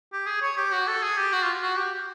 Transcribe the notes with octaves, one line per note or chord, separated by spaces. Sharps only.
G4
G#4
C#5
G4
F#4
A4
G#4
G4
F#4
F4
F#4
G4